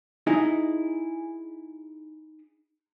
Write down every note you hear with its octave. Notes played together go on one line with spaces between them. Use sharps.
D#4 E4 G#4